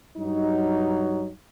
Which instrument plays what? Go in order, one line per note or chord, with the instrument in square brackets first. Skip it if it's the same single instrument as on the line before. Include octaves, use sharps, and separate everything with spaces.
[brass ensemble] G2 F#3 D#4